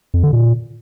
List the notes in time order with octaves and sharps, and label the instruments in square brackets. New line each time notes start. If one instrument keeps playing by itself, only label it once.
[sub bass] F2
D3
A#2